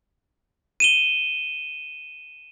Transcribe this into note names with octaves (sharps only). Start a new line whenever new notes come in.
D#7 E7 G7